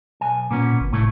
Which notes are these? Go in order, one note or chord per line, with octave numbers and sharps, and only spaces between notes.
B1 G#5
A#2 A#3 B3 C#4
G1
A2 C3 A3 E4